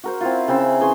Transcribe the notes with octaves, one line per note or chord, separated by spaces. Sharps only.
F#4 A#4 C5
C4 E4 F4
C#3 C4 E5 B5
E3 G#4 C6 C#6